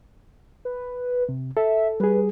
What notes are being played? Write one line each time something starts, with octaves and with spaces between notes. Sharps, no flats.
B4
C3
A4 E5
G3 G#4 B4